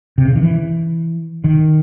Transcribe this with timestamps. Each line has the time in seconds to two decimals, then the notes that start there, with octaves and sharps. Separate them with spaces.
0.18 C3
0.25 C#3
0.36 D#3
0.43 E3
1.44 D#3